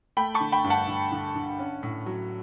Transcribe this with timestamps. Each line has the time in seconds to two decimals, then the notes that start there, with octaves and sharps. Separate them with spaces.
0.17 A3 G5 B5
0.34 A5 C#6
0.40 D3
0.52 G5 B5
0.64 G2
0.70 F#5 A5
0.88 D3
1.12 D3
1.35 D3
1.59 C#4
1.83 A2
2.06 F#3